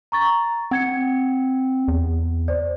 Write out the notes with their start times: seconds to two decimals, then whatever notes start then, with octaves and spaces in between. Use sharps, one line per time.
0.12 A#5 C#6 A6
0.71 C4 F#5 G#6 C#7
1.88 E2
2.48 C5 D5